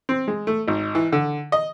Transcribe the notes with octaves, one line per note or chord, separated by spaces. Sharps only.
C4
G#3
A3
G#1
E3
D3
D#5